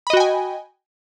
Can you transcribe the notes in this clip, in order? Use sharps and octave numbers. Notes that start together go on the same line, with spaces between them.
F#4 D#5 G5 G#5 B5